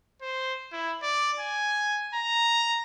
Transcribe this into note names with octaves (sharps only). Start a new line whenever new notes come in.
C5
E4
D5
G#5
A#5